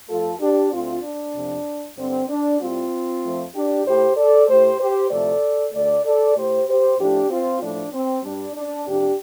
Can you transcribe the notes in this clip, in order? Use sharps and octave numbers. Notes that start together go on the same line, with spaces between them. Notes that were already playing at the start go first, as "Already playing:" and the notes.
F2 F3 A3 F4 A4
D4 G4
D2 D3 A3 C4 F4
D4
F2 C3 F3
G2 D3 G3 C4
D4
A2 G3 C4 F4
F2 F3 A3
D4 G4
A2 A3 G4 C5
A4 D5
A2 A3 G4 C5
G4 C5
D2 C3 F3 A3 A4 D5
D2 D3 A3 A4 D5
A4 D5
A2 A3 G4 C5
G4 C5
A2 F3 A3 D4 G4
C4 F4
A2 F3 A3 D4
C4
G2 G3 D4
D4
F2 C3 F3 D4 G4